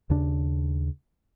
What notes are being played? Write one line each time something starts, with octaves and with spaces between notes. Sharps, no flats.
D#2 C#3 D4